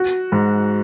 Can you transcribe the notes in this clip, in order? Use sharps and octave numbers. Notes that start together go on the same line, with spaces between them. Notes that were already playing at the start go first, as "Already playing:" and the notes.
Already playing: F#4
G#2